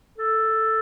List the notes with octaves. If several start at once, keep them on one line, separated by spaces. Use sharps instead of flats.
A4